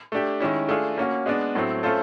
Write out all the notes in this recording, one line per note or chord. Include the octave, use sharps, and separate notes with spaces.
A3 D4 G4
D#3 G#3 C#4 E4
A3 D4 F4 G#4
A#3 C#4 F#4
G#3 B3 D4
A2 F#3 A3 C4
A3 C#4 F4 A4 C5